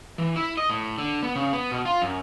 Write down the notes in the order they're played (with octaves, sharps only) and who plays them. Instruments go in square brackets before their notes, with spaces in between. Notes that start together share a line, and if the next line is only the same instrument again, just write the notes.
[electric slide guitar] E3
E4
D#5
A2
D3
B3
C#3
B3
B2
F4
F#2